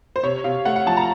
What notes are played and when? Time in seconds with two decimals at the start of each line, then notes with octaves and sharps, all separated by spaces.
0.16 C5
0.23 C3 C#5
0.44 C3 F5
0.65 A3 F#5
0.76 F#5
0.87 F3 A5
0.97 A#5